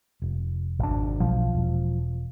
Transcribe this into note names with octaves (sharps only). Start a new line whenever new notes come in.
F1
G#1 D4
B1 F3
E1